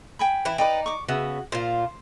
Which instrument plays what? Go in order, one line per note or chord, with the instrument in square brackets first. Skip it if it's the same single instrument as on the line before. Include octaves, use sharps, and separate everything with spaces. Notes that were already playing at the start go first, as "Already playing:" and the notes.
[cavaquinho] G5 G#5 B5
[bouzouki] E3 E4
[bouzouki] D#4 [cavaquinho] B4 D5 G5
[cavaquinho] C#6 D6
[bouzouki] C#3 B3 E5 [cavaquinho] F#4
[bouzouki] A#2 F4 [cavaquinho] C5